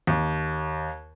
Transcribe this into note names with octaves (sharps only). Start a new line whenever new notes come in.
D#2